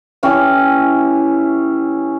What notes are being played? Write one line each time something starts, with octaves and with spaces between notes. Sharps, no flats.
E3 C#4 E4 G4